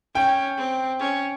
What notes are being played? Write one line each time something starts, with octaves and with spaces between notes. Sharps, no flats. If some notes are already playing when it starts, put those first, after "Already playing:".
C#4 G5
C4
C#4